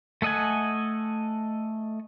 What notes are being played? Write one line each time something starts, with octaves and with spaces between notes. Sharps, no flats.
A3 A4 D#5 F#5 G#5